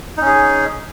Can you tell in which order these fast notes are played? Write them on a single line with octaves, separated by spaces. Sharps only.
D#4 C#4 G#4